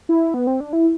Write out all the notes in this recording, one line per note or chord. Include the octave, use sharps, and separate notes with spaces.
E4
B3
C4
D4
E4